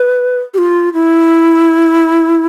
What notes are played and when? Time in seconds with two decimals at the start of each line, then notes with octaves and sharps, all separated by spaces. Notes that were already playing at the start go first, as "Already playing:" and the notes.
Already playing: B4
0.54 G4
0.58 F4
0.94 E4